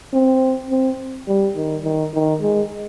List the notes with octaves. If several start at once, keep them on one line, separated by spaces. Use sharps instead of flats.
C4
C4
G3
D#3
D#3
D#3
G#3